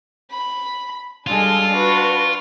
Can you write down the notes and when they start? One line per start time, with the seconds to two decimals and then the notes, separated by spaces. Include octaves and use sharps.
0.31 B5
1.27 G3 G#3 D4 F4 A4
1.71 D4 F#4 B4